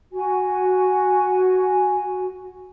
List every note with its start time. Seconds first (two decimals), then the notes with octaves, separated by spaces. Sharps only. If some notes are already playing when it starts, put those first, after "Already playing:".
0.13 F#4 G#5